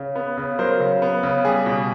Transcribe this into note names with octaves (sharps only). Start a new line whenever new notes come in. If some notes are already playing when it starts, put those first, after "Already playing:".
Already playing: C#3
B3
C#3
F#3 A#4 C5
C#3
B3
C#3
G3 G#4
B2